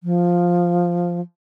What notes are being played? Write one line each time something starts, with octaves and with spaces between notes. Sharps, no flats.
F3